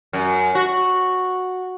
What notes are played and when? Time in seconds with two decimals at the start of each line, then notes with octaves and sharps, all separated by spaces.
0.13 F#2
0.55 F#4